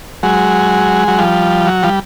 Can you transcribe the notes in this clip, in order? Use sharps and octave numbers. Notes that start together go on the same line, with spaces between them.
F#3 G#3
F#3
F3 G3
F#3
F3 G3